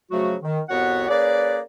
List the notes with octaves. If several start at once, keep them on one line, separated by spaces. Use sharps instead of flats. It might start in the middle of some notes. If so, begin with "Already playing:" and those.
C#3 F3 F#3 A3 F#4
D#3
C2 F2 B3 F#4 C#5 F#5
A#3 C#4 G#4 B4 D5